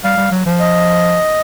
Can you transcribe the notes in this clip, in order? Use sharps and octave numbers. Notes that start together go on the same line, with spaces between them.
G3 F5
G3
F#3
F3
D#5